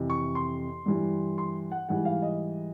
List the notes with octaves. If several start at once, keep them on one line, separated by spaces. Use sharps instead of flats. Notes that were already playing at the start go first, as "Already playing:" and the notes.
Already playing: F2 C3 E3
C#6
C6
G2 E3 G3
C6
F#5
G#2 E3 G3 F#5
F5
D#5